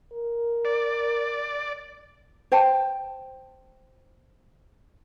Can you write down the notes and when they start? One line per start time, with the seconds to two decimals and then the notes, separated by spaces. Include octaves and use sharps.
0.13 A#4
0.65 D5
2.52 C5 G5 A5